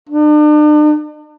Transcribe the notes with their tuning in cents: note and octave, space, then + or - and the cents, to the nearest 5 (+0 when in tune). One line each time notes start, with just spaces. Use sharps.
D4 +40